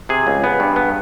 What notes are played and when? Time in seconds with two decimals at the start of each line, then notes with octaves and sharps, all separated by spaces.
0.09 C3 G#4
0.27 C#2
0.44 B3
0.60 G2
0.76 B3